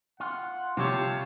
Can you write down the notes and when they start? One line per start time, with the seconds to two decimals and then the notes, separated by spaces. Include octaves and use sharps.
0.20 F4 F#5
0.77 C3 F3 G3 F4 G4 C#5 A5